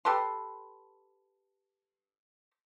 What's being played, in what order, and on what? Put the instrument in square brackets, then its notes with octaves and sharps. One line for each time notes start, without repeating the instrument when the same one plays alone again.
[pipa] G4 A4 B4 C6